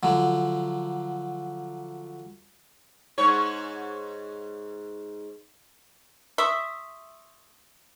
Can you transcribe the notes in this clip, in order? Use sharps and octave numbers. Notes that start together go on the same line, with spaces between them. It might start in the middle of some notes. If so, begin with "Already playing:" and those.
D3 F3 F#3
G#2 C#5
E5 C6 C#6 D#6